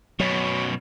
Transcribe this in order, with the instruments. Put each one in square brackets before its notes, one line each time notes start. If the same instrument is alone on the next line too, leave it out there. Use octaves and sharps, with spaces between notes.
[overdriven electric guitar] F#2 B2 [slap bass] F#3